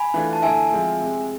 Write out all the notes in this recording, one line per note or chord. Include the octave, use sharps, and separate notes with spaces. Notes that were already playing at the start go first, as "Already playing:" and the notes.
Already playing: G#5 B5
E3 A3 D4 F4
A5
D3 A3 E4 E5 G#5
F3 G#3 C4 F4
C3 G#3 C4